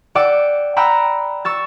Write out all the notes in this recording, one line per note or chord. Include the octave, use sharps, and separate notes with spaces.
D5 F#5 G5 D6 E6
F#5 G5 A#5 B5 E6 F#6
C#6 E6 A6